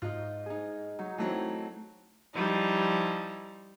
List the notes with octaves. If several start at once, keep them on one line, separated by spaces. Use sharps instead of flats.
G#2 D#4 F4 F#6
D#4 G#4
F#3 D#4
E3 F#3 A3 C4
F3 G3 D#4 E4